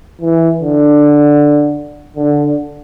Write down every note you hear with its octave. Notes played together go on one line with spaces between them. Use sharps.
E3
D3
D3